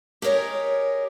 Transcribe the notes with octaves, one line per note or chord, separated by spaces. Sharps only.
G4 G#4 A#4 C#5 D#5